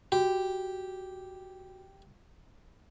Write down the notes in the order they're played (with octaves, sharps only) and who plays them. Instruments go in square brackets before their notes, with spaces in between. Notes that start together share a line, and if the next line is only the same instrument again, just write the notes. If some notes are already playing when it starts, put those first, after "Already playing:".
[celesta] F#4 [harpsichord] G4